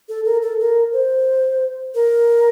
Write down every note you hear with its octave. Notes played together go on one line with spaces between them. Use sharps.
A4
A#4
A4
A#4
C5
A#4